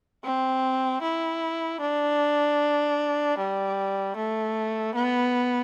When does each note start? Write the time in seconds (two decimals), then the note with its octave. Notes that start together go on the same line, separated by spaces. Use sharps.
0.24 C4
1.02 E4
1.81 D4
3.38 G3
4.16 A3
4.95 B3